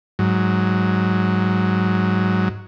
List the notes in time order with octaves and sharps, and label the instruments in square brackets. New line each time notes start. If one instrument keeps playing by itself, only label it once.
[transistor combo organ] G#2 F#3